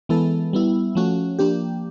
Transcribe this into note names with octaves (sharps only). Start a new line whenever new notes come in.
E3 G#3 B3 E4 A4
G3 B3 E4
F3 A3 C#4 F#4
F3 A#3 D4 G4